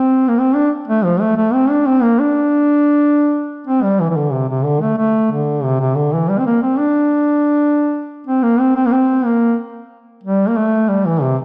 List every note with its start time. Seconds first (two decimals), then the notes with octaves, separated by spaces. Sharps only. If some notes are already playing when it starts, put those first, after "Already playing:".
Already playing: C4
0.28 A#3
0.39 C4
0.55 D4
0.88 A3
1.05 F3
1.21 A3
1.37 A3
1.54 C4
1.70 D4
1.87 C4
2.02 A#3
2.20 D4
3.67 C4
3.83 G3
4.00 E3
4.11 E3
4.16 D3
4.33 C3
4.49 C3
4.65 D3
4.82 A3
4.98 A3
5.32 D3
5.64 C3
5.81 C3
5.97 D3
6.13 E3
6.30 G3
6.39 C4
6.46 A#3
6.63 C4
6.79 D4
8.27 C4
8.43 A#3
8.59 C4
8.76 C4
8.86 A#3
8.92 C4
9.25 A#3
10.24 G3
10.49 A#3
10.57 A3
10.89 G3
11.06 E3
11.22 C3